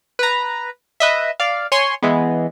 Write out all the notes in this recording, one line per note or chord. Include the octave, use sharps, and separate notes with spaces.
B4 A#5
B4 D#5 E5
D5 F5
C#5 G#5 C6
E3 G#3 B3